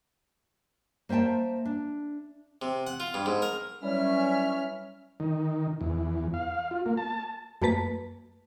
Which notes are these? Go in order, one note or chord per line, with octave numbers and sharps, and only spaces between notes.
A#3 C5 E5 G5 A5
D4
C3
F#5
F4
G2
G#2
A#4
E3 F#3 G3 C#4 E5 F6
D#3
E2
F5
F4
A#3
A5
F#2 A3 A#3 B4 A5 B6